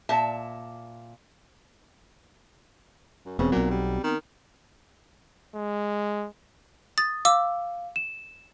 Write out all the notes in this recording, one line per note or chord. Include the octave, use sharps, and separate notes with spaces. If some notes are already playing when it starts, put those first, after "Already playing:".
A#2 E5 A5
F#2
E1 C#3 B3 C4
B1 A#2 F#3
G3
D#3
G#3
D#6 A6
F5 D6 E6
E7